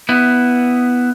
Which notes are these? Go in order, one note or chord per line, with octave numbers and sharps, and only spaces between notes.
B3 E4